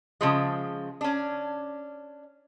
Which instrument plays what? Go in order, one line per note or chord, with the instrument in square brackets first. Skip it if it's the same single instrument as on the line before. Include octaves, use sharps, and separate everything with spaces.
[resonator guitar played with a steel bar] C#3 F3 G#3
C#4 D4